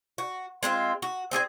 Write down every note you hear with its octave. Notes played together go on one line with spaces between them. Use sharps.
F#4
G#3 C4 D4 F4
F#4
C4 G#4 C#5 G#5